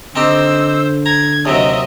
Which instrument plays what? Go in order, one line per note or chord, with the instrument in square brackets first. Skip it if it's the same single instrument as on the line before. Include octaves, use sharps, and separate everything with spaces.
[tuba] D3 [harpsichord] C4 D#4 G4 [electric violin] C5 E6
[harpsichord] A#5 [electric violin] G#6
[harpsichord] D#2 C3 F#3 [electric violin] D#5 E5